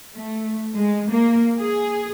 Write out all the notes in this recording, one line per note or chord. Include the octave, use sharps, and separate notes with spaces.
A3
G#3
A#3
G#4